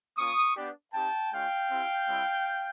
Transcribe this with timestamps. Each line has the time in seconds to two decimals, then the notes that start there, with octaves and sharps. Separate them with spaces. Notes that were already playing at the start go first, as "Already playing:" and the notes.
0.18 A#3 C#4 F4 C#6 D#6
0.56 B3 D4 G4
0.94 C4 D#4 G4 G5 A5
1.32 G#3 C#4 F4 F5 G5
1.70 C4 E4 G4
2.08 G3 C4 E4